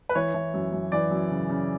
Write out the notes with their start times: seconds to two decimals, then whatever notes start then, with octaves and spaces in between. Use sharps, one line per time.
0.09 B4
0.15 E3 C#5
0.34 E3
0.54 F#2
0.73 F#2
0.92 E3 D5
1.11 F#2
1.31 C#3
1.49 C#3